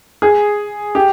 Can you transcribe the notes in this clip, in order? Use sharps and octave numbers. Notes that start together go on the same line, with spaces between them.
G#4
G4